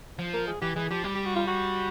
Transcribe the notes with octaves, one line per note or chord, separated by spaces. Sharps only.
F3
A#4
G#4
E3 G4
E3 G#4
F3 G4
G3 G4
G4
F#4
F4
F#4